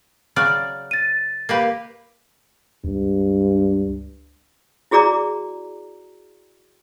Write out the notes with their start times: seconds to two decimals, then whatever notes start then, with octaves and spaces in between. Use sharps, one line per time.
0.36 C#3 F#3 D5 F6 F#6
0.91 A6 D#7
1.49 A#3 G4 B4
2.84 C#2 G2
4.91 E4 F#4 G#4 D5 A#5 D6